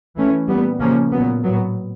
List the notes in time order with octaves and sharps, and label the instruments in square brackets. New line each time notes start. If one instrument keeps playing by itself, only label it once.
[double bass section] E3 A3 C#4
A#2 G3 B3
C#3 F3 A#3 C#4
A#2 F#3 B3
A2 F#3 B3